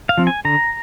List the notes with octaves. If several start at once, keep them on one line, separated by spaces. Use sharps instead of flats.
F5
F3 C4
G#5
D3 A#5